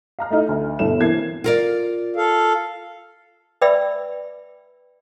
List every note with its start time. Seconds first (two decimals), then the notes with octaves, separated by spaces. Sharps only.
0.19 F5 A#5 F6
0.31 A3 D#4 E4
0.49 D2
0.79 G1 C2 B2 A4 C#5 E7
1.00 E3 A#3 C4 G#6 C7
1.44 F4 A#4 D5
2.16 A4 F5
3.62 B4 D5 E5 G5 B5 E6